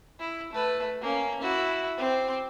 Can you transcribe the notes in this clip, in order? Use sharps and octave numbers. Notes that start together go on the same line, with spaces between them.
E4
A3 B4
A#3 C#4
E4 F#4
C4 D6